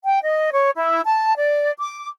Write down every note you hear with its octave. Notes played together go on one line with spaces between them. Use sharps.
G5
D#5
C#5
E4
A5
D5
D6